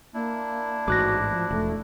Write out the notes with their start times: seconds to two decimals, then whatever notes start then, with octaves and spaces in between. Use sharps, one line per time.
0.14 A#3 D4 E4
0.88 A1 G#2 F#4 D6 F#6 A#6
1.32 F3
1.51 E1 A3